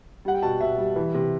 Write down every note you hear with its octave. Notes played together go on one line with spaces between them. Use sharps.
G3 F#5
G5
B2 A5
B2 E5
G3
E3
C3